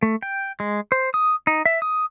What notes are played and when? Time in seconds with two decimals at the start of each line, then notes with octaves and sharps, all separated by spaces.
0.03 A3
0.23 G5
0.60 G#3
0.92 C5
1.14 D#6
1.47 D#4
1.66 E5
1.82 D#6